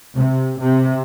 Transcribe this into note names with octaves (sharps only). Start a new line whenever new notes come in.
C3
C3